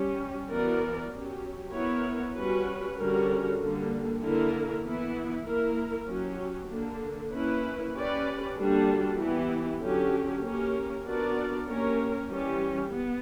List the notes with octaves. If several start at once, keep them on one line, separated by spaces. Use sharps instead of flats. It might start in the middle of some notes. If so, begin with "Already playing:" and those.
Already playing: G3 C#4 G4
E3 B3 F#4 A#4 D5
F#3 C#4 G4
B3 E4 A#4 C#5
G3 C#4 F#4 B4
D3 G3 C#4 F#4 A#4
D3 G3 A#3
D3 A#3 E4 A#4
E3 B3 E4
A#3 E4 A#4
F#3 C#4 G4
D3 A#3 D4
A#3 C#4 E4 B4
C#4 G4 B4 D5
D3 G3 A#3 D4 F#4
E3 B3 E4 G4
D3 F#3 C#4 G4
A#3 C#4 G4 A#4
B3 D4 F#4 A#4 D5
A#3 C#4 G4 A#4 C#5
E3 G3 C#4 G4
B3